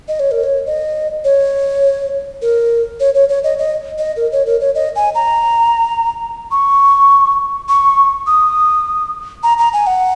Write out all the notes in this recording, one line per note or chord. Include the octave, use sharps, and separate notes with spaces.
D#5
C#5
A#4
C#5
D#5
C#5
A#4
C#5
C#5
C#5
D#5
D#5
D#5
A#4
C#5
A#4
C#5
D#5
G#5
A#5
C#6
C#6
D#6
A#5
A#5
G#5
F#5